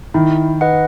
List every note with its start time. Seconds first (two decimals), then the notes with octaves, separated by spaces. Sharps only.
0.14 D#3 E4
0.61 B4 D#5 F#5